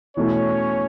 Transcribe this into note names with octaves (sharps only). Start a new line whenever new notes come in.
E2 B2 A3 C#4 E4 C#5